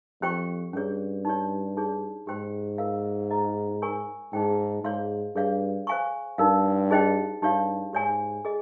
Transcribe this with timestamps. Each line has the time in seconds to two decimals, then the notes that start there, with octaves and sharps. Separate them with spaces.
0.21 F2 G4 C5 G5 C#6
0.73 G2 C#4 G#4 C#5
1.25 D#4 G4 C#5
1.77 D#4 G#4 C#5
2.27 G#2 G4 C5 G5 C6
2.78 F4 A#4 F5
3.31 G#4 D#5 A#5
3.82 A#4 C#5 G#5 C#6
4.33 G#2 D#4 G#4 C5 G5
4.84 G#2 G#4 C#5 F5 C6
5.35 G2 G#4 C#5 F5
5.87 C5 F5 G#5 C#6
6.38 G2 D#4 A#4 F5
6.91 D#4 G#4 C5 D#5 G5
7.42 G2 D#4 G4 C#5 F5
7.93 G#2 G4 C#5 G#5
8.45 G#4 D#5